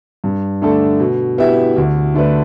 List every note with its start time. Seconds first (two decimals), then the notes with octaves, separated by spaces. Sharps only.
0.24 G2
0.61 D3 A3 D4 A4
0.99 B2
1.38 B3 E4 G4 E5
1.77 D2
2.14 D3 A3 D4 B4